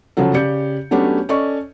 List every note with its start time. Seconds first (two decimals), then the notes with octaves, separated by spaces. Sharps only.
0.17 C#3 F3 F#3 A4
0.34 C#3 G4 D5 G6 C#7
0.91 F#3 A3 B3 C#4 D4 G4
1.29 C#4 A4 D5 D#5 C#6